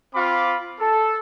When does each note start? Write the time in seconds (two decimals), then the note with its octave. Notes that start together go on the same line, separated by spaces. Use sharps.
0.14 C4 F4 F5 B5 D6
0.79 A4